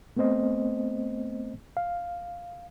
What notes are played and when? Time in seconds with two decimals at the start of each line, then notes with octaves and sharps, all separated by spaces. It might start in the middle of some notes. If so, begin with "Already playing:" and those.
0.16 A3 B3 C4 C5 D#5
1.77 F5